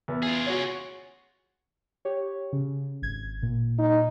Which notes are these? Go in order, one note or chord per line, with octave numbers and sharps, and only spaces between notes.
E2 B3
F4 G#4
F#4 C#5
G4 C#5
C#3
G#1 G#6
A#2
D#4